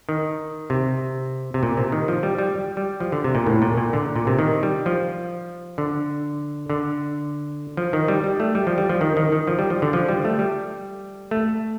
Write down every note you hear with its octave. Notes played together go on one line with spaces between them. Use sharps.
D#3
C3
C3
A#2
C3
D#3
F3
G3
G3
G3
F3
D3
C3
A#2
A2
A#2
A#2
D3
A#2
C3
D#3
G3
F3
D3
D3
F3
D#3
G3
G3
A3
G3
F3
G3
F3
D#3
D#3
D#3
F3
G3
F3
D3
F3
G3
A3
G3
A3